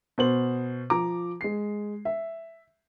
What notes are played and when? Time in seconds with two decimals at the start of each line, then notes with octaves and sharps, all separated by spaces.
0.18 B2 C5 F#7
0.90 F3 A#5 D6
1.41 G#3 C7
2.05 E5